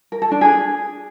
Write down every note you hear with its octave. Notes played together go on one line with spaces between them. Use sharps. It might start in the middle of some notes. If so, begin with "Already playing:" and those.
A#4
A4
D4
G#4